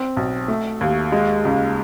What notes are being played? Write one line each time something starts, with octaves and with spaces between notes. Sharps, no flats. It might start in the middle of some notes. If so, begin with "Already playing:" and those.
Already playing: C4
B1
A3
D#2
G#3
C#2